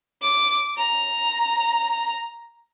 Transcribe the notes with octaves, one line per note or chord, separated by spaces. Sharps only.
D6
A#5